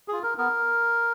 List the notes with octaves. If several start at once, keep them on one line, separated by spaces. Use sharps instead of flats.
F4 G#4
A#4
B3 A#4